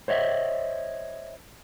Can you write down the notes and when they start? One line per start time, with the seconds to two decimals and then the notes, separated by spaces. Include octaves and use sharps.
0.08 C5 C#5 D#5 E5